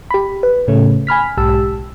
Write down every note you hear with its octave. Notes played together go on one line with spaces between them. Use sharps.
G4 B5
B4
A2 C#3 A3 C#4
G#5 B5 F6 B6
B1 G#2 G4 A5 E6